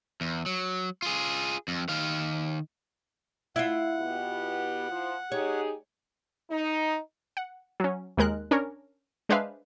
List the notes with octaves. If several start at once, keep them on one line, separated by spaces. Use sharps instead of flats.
E2
F#3
F4 G#4
F2
D#3 F5
E4 F4 F#5
B2 B3 G4
F3
D#4 G4 G#4 C#5
D#4
F#5
F#3 C#4
D#2 G#3 A#4 F#6
C#4 D4 A#4 C#5
G#3 D4 B4 C5 E5 F5